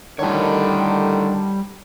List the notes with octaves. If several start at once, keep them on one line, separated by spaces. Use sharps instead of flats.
A2 D3 D#3 G3 C#5